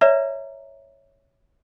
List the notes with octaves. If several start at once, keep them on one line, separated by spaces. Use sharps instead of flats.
B4 C#5 D5 E5 A#5